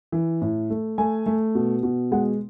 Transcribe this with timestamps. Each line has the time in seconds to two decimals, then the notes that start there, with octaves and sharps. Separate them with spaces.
0.12 E3
0.42 A2
0.70 A3
0.98 A3 G#5
1.26 A3
1.55 B2
1.83 B2
2.12 G#3 F#5